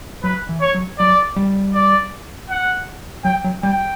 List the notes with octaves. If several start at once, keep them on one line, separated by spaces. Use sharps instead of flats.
F#3 B4
E3
C#5
F#3
F#3 D5
G3
D5
F#5
F#3 G5
F#3
G3 G5